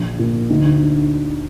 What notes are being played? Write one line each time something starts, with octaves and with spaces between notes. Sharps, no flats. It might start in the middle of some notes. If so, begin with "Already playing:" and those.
Already playing: A#1
A#2
D2 D#4
D3